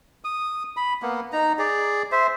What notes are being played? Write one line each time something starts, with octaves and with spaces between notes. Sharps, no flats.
D#6
B5
A#3 B3
D#4 A#5
G#4 D5
C5 E5